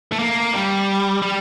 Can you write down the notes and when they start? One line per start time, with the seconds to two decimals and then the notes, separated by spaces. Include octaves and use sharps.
0.12 A3
0.19 A#3
0.53 G3
1.22 G3